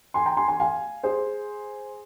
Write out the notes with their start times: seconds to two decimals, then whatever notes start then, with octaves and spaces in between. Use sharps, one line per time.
0.14 G#5 C6
0.26 G5 A#5
0.37 G#5 C6
0.48 G#5 C6
0.60 F5 G#5
1.03 G#4 C5